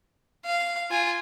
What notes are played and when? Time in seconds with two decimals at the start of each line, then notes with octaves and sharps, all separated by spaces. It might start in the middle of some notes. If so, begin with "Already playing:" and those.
0.45 F5
0.90 F4 G#5